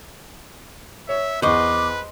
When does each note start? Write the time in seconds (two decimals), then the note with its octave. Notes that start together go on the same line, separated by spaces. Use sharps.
1.09 C#5 E5
1.42 E2 B4 C5 D#5 C#6 D6